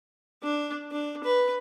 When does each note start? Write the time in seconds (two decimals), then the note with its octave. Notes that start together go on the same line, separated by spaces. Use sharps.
0.43 D4
0.91 D4
1.24 B4